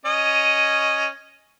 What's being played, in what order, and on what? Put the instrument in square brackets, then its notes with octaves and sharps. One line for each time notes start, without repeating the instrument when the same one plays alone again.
[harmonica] C#4 D#5